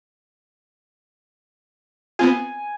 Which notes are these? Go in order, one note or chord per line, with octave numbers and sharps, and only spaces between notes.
B3 C4 F4 G#5